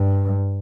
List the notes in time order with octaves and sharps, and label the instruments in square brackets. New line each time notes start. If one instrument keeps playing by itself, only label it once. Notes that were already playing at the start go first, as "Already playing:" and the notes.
Already playing: [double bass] G2